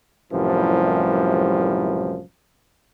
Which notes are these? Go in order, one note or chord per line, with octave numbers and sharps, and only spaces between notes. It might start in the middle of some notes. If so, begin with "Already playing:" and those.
C2 F#2 A2 E3 F3 G3